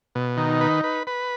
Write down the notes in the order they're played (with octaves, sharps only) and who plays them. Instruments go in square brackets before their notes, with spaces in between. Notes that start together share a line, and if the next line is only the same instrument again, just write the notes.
[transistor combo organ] B2
[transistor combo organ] D#3 [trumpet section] D#4
[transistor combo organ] B4
B4
B4